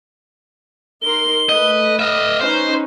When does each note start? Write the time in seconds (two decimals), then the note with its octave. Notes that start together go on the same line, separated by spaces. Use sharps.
1.02 D#4 A#4 C6 G7
1.49 A3 B4 D#5
2.00 D#5 E5 F6
2.41 C#4 D#4 B4 C5